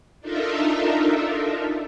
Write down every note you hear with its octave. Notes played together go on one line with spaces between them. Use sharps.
D4 D#4 F4 A4 A#4 E5